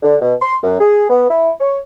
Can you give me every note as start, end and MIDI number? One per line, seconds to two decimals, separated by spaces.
0.02 0.17 50
0.21 0.34 47
0.41 0.56 84
0.63 0.79 42
0.80 1.04 68
1.10 1.25 59
1.29 1.51 64
1.60 1.79 73